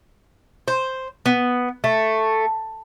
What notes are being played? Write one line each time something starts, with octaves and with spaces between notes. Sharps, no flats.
C5
B3
A3